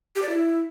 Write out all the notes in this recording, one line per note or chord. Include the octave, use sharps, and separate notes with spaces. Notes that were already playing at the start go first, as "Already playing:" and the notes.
G4
D5
E4